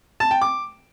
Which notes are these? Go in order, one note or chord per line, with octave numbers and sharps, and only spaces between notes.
A5
G5
D6